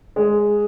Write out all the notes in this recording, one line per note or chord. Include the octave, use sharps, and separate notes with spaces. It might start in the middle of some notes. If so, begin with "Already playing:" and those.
G#3